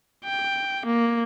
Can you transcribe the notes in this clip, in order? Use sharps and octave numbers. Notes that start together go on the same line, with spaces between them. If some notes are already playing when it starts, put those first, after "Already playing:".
G5
A#3